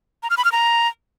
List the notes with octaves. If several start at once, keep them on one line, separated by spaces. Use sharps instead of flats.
A#5
F6
B5
F6
A#5